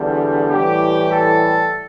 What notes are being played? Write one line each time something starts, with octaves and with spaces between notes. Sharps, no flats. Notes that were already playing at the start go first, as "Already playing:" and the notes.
Already playing: E2 D3 G3
A2 E3 G3 G4
A4